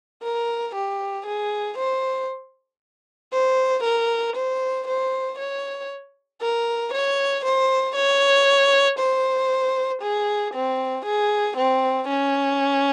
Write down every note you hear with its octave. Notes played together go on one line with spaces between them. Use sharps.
A#4
G4
G#4
C5
C5
A#4
C5
C5
C#5
A#4
C#5
C5
C#5
C5
G#4
C4
G#4
C4
C#4